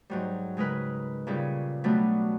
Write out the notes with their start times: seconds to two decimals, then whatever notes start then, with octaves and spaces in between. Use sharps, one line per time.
0.10 G#2 F#3 G3
0.57 C#3 G#3 A#4 B4
1.27 A#2 C#3 G3 C#4 G#4
1.84 B2 F#3 G3 A3 B3 D4